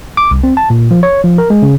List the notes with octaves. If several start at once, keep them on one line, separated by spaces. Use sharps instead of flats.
D6
C2
C4
A5
A#2
F3
C#5
F3
A#4
G#3
C#3